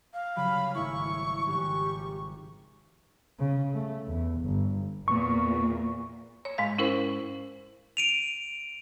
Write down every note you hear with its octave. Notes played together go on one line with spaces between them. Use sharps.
F5
C#3 F#3 G3 B5
G#1 A3 E4 C#6 E7
G#1 F3 G4 C#6 F#6
C#3
A3
E2
G1
E2 A#2 C#6
C#5
G#2 G#3 F5
C#4 E4 A#4 C5
D7 D#7 F7